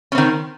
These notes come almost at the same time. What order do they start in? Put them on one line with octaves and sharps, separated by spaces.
C#4 C4 D#3